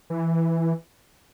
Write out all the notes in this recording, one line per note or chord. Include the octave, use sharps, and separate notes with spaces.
E3